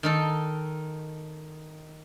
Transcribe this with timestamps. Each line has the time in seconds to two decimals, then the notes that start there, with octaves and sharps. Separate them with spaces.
0.03 D#3 D#4 A4